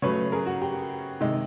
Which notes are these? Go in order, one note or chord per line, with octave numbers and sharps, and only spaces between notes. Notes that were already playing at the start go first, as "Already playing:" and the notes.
C#3 F#3 A3 B4 C#5
G#4 A#4
F#4
G4
C3 D#3 G#3